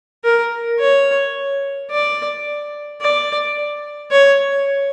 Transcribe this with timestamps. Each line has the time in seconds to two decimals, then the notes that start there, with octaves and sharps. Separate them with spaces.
0.24 A#4
0.80 C#5
1.91 D5
3.01 D5
4.12 C#5